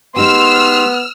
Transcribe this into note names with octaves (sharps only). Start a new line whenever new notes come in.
G#3 B3 D#4 G4 C6 E6 F6